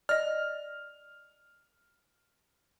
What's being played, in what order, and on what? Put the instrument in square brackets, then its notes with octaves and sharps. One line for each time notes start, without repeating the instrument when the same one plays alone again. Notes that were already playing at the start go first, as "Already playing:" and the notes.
[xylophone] D5 D#5 [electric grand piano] F6